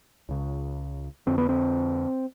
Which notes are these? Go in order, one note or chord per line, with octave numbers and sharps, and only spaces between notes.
C#2 C#3
F2 D3 C4
B3
C4